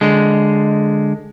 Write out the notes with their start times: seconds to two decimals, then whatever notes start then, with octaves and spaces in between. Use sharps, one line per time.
0.01 D3 G#3